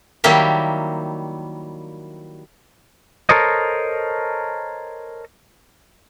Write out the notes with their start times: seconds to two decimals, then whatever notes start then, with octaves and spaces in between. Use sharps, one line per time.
0.24 D#3 F#3 G3 A#3 E4 G4
3.29 A4 A#4 C5 C#5 D#5